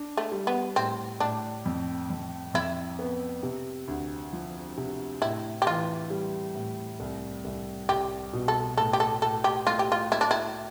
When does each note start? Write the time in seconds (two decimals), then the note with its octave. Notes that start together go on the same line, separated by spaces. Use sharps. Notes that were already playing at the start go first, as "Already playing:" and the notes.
Already playing: D4
0.17 A3
0.32 G3
0.47 B3
0.76 A2 C4
1.20 A2 D4
1.66 F2
2.10 F2
2.54 F2 E4
2.99 B3
3.43 C3
3.88 D2
4.33 F3
4.77 C3
5.22 A2 E4
5.62 G4
5.67 E3 F4
6.10 G3
6.55 A2
7.00 C2
7.45 C2
7.89 C2 G4
8.33 B2
8.48 A4
8.77 A2 A4
8.93 G4
9.00 A4
9.22 A2 A4
9.44 G4
9.67 A3 F4
9.79 G4
9.92 F4
10.12 A3 E4
10.21 D4
10.31 E4